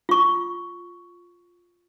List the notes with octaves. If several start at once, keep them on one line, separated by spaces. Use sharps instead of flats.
F4 C#6